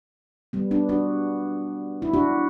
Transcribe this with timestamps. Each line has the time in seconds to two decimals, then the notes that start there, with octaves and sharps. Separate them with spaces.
0.53 G3 B3
0.71 B3 D4
0.89 D4 F#4
2.02 E4
2.14 D4 F#4